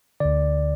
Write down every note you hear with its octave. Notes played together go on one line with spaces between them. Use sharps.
D2 D3 D5